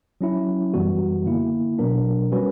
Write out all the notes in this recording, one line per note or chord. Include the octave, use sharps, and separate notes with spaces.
F#3 C#4 E4
F#2 E3 G3 B3 F#4
D3 A#3 E4
B2 F#3 B3 D4 A#4
G3 C#4 F#4 B4